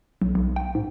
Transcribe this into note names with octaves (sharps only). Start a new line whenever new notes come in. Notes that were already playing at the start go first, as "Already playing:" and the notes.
B1
B1
G5
G#2